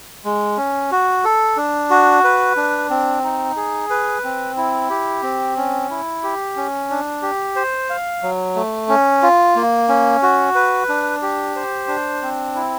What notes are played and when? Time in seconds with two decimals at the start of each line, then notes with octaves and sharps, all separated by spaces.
0.24 G#3
0.57 C#4
0.91 F#4
1.24 A4
1.57 D4
1.90 F#4
2.24 B4
2.56 D4
2.90 C4
3.24 D#4
3.56 G#4
3.90 B4
4.24 C4
4.57 E4
4.90 G4
5.23 C4
5.57 C#4
5.90 E4
6.23 G4
6.56 C#4
6.90 D4
7.22 G4
7.56 C5
7.90 F5
8.23 F#3
8.56 A3
8.89 C#4
9.23 F4
9.56 A#3
9.89 C#4
10.23 F#4
10.55 B4
10.89 D4
11.22 G4
11.56 C5
11.88 D4
12.22 C4
12.55 E4